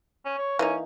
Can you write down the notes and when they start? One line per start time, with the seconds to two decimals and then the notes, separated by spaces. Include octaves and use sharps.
0.25 C#4
0.38 C#5
0.59 E3 A#3 C#4 D#4